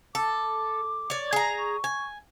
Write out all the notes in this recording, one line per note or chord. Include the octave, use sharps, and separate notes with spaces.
A4 D6
C#5 D5
G#4 A#5
C#6
G#5